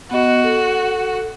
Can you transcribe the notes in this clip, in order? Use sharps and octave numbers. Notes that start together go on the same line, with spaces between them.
B3 F#4 D#5
A4